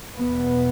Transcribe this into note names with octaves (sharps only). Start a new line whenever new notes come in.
E2 B2 B3